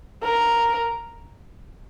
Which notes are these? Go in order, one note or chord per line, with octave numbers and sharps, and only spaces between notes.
A#4